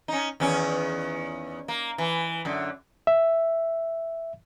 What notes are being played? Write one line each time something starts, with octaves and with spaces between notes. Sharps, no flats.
C#4 D#4
E2 D#3 C#4
A#3
E3
F#2 D3
E5